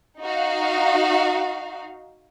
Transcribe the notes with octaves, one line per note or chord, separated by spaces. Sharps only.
D#4 F#4 F5